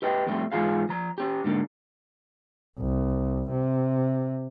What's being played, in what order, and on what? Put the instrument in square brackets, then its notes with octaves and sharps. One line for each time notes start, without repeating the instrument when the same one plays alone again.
[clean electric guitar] G4 B4 D#5 G5
F2 A2 G3 A3 C4
G#2 E3 F4 G#4 F5
F3 A#5
C#4 G4
G#2 D3 A#3
[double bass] C2
C3